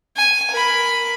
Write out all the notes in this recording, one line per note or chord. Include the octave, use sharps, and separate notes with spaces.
G#5
A#4 B5